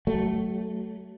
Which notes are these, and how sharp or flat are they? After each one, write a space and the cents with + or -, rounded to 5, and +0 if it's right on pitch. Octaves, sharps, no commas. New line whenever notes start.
F#3 +30 A3 +0